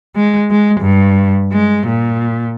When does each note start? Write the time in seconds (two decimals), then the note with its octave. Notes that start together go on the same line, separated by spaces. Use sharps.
0.16 G#3
0.51 G#3
0.81 G2
1.53 G#3
1.87 A#2